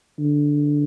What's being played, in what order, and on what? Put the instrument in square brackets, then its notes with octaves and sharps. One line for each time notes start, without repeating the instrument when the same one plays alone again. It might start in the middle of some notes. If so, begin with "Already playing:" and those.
[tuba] D3